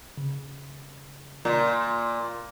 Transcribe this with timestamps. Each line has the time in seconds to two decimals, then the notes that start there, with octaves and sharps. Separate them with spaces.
0.17 C#3
1.45 A#2 A#5 C6